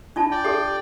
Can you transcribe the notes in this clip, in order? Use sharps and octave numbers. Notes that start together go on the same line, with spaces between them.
D4 F4 A5
D5 G5
G4 A4